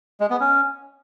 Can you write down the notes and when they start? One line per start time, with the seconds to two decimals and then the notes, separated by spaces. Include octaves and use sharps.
0.20 G#3
0.30 B3
0.40 C#4